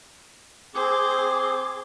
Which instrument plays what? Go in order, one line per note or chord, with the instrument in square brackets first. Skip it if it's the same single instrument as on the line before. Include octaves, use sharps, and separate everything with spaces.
[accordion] C4 G#4 [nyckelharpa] C5 [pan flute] D6